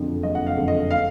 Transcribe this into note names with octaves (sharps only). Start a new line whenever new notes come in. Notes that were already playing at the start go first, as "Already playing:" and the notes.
Already playing: F#1 F2 D3 F3
F#1 D#5
F#5
F5
F2 D3 F3
D#5
F5